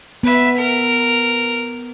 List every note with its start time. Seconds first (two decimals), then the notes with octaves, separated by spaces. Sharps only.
0.23 B3 B4 E5
0.56 A#4